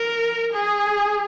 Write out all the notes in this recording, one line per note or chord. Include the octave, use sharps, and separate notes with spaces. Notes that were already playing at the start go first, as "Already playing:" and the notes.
Already playing: A#4
G#4